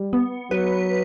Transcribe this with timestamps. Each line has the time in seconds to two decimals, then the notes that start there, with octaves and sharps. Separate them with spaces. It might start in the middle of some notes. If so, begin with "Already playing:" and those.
Already playing: G3
0.13 B3
0.51 F#3 B4